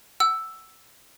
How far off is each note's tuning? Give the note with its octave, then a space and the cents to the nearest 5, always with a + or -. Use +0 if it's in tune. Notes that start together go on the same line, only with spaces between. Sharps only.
F#5 +25 E6 +0